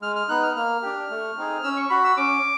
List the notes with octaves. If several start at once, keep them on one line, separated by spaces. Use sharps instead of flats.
G#3 F6
F6
B3 D#4 F#6
F6
A#3 F6
D4 G4
A3
C4 D#4 G#4
C#4 E6
C#6
F#4 B5
E6
C#4 D6